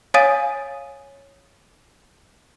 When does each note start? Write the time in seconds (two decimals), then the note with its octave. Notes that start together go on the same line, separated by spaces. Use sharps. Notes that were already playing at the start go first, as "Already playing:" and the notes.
0.14 C#5 F5 G#5 D#6 A6 D#7